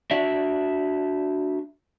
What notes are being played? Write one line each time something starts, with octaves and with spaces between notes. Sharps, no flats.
D4 F#4 E5